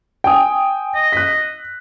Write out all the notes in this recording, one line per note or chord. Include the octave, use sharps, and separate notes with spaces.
G5 G#5 D#6
D#5
F#6 B6